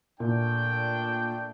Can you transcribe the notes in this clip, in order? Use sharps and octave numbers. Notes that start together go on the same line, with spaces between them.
A#2 A3 D4 G5